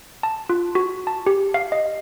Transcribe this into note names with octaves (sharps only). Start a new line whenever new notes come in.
A5
F4
F#4
A5
G4
F5
D#5